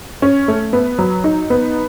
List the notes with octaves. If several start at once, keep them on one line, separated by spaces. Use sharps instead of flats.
C#4
A3
B3
F#3
D#4
B3